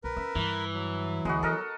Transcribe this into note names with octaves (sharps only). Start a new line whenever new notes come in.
B1 A#4 B4
C#4 E5
G2 E3
F#3
D2 G#3 B3 F#4
D#4 A4 A#4 D#5